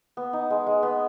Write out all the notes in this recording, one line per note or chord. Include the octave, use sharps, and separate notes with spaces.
B3
D#4
G#3
G#3
B3